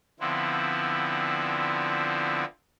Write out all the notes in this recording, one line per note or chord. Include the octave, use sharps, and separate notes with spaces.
D3 F3 B3 C4 E4